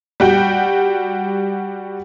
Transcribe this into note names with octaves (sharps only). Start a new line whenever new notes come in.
G3 F#4 G5